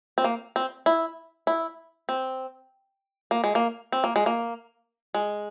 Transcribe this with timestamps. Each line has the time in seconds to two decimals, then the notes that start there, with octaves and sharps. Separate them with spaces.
0.18 C4
0.24 A#3
0.56 C4
0.86 E4
1.47 E4
2.09 C4
3.31 A#3
3.44 G#3
3.55 A#3
3.92 C4
4.04 A#3
4.16 G#3
4.26 A#3
5.15 G#3